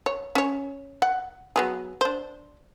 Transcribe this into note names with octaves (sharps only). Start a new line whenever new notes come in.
C#5
C#4 C#5
F#5
F#3 B3 G#4
D4 C5